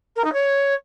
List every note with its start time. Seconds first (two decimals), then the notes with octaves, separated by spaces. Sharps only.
0.16 A#4
0.24 D#4
0.33 C#5